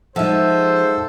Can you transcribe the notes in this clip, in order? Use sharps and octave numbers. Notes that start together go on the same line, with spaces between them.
F3 G#3 D#4 A4 C5 E5 F#5